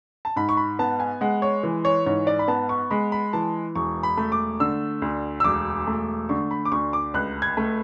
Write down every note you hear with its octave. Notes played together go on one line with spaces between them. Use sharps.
A5
G#2 B5
C#6
B5
B3 A5
G#5
G#3 F#5
C#5
E3
C#5
G#2 C#5
D5
B5
B3 A5
C#6
G#3 B5
B5
E3 A5
E1 C#6
B5
A3
D6
D3 E6
D2
E6
E1 D6
A3
D3 C#6
B5
D6
D2 C#6
D6
C#2 F#6
G#6
A3